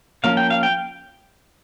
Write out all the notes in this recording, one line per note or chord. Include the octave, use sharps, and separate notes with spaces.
F3 A#3 C#4 F5
G5
F5
G5